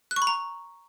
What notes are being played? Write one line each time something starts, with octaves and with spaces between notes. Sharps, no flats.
F#6
C#6
B5
A#5